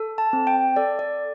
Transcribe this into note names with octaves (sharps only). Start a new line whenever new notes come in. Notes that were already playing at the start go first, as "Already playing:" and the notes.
Already playing: A4
A5
C4
G5
A4 D5
D5